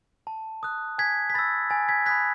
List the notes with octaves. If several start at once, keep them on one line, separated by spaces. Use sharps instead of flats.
A5
D#6 F#6
G#5 G#6 B6
B6
B5 E6 A6
G#5 A6
G#6 B6
B5 D#6 F#6 G#6 B6